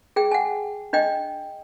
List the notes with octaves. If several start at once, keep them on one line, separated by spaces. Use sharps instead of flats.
G#4 G5
F#5 G#5
D4 D#5 G5